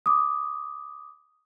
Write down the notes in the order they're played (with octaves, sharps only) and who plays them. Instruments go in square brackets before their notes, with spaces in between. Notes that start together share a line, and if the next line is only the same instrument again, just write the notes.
[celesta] D6 D#6